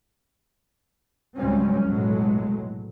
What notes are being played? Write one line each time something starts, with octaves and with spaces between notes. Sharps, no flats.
C#2 G#2 F#3 G3 C4 C#4
F1 B1 A2 F#3 G#3